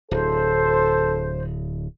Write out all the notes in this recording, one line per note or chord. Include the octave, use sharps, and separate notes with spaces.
D1 A4 C5